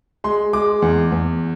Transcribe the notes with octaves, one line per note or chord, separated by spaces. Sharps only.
G#3 C6
G#3 D6
E2
E2